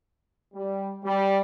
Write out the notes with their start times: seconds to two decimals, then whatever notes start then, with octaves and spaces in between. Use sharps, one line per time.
0.54 G3
1.03 G3